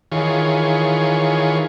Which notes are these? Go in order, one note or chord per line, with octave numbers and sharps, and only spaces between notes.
D#3 E3 F4 G#4 C#5